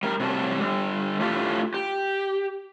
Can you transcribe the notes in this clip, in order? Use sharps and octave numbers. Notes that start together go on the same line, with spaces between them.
G3 A#4
C3 F#3 G3 A5
D3 G3
A2 A3 D4 F4 G4
G4